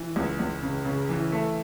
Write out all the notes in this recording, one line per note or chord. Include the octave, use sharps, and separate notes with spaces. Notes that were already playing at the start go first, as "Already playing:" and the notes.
Already playing: E3
C#2
C#2
C#3
C#3
E3
A3